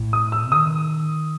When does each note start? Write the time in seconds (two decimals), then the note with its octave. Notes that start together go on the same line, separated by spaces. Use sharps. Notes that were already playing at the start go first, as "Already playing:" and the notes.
Already playing: A2
0.13 D#6
0.32 E6
0.52 D#3 D#6